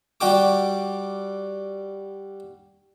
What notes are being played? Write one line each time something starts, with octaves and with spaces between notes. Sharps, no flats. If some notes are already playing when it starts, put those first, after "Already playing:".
G3 F#4 G4 D6